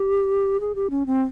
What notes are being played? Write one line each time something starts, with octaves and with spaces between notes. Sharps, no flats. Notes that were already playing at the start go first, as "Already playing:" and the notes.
Already playing: G4
G#4
G4
C#4
C4